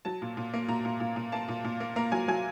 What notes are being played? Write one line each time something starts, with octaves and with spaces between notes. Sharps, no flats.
F#3 A5
A#2
A#2
A#3
A#2 A#5
A#2
A#2
A#2
A#3 A5
A#2
A#2
A#3
A#3 A#5
F#3 G#5
F#3 G#5